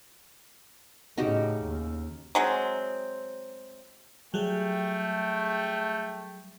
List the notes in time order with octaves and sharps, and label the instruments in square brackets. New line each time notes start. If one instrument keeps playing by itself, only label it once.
[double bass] A2 C#3 [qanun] D#4 F#4 G4
[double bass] D#2
[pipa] F#3 G#3 C4
[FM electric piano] F#3 G3 G#4 [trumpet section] A3 G5